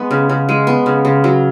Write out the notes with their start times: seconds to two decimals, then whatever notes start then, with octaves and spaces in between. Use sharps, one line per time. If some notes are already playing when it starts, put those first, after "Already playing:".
Already playing: G#3 B3
0.11 C#3
0.29 C#3
0.49 G#3
0.67 B3
0.86 C#3
1.05 C#3
1.24 F#3